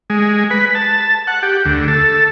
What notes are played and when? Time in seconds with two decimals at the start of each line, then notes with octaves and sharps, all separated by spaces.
0.10 G#3
0.51 B4
0.75 A5
1.27 F#5
1.43 G4
1.65 D2
1.88 A4